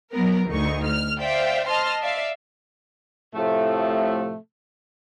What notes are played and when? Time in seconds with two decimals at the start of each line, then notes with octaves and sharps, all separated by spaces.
0.12 F#3 B3 A#4
0.47 D2 D#4 C#6
0.84 F6
1.19 C5 D5 E5 F5 G5
1.68 D#5 A5 C6 F6
2.01 D5 E5 F5
3.34 A2 C3 F3 A3